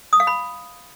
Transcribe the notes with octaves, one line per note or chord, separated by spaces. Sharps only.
D#6
F5
B5